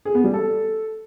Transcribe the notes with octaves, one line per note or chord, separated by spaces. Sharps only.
G#4
B3
G3
A4